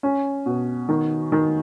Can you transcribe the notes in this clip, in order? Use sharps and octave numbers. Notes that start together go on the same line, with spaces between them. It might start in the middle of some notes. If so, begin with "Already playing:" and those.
C#4
B2
D#3
D#3